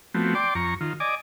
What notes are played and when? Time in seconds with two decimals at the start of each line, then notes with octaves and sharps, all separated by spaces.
0.14 F3 A3 B3 C4 F#4
0.35 D5 G5 C6 D6
0.55 F2 A#5 C#6
0.81 D#3 F4
1.00 D5 D#5 G#5 D6